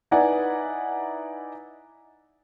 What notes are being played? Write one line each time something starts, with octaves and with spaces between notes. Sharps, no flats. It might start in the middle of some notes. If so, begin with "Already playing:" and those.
D#4 E4 B4 D5 F#5 G#5